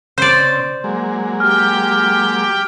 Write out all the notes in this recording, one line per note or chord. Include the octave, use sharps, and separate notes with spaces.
C#3 C4 C5 D5
F#3 G#3 A#3
G4 G5 F6